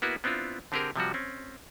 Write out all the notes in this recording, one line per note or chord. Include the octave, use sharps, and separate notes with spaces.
A#3 B3 E4 F#4 B4
B3 C4 D4 E4 F4
D3 C4 G4 G#4 A#4
C3 F3 G3 F#4
C4 C#4